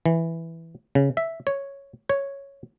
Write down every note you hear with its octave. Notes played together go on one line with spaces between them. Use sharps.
E3
C#3
E5
C#5
C#5